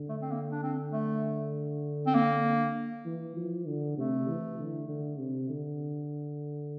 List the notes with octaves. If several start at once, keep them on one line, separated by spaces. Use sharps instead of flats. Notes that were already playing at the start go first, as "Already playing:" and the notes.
Already playing: D3
A3
C4
A#3
D4
C4
A3
C4
A#3
E3
F3
D3
C3 A3
E3
D3
D3
C3
D3